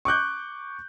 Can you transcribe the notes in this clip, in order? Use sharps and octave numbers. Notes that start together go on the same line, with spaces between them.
C#6 D6 F#6 G6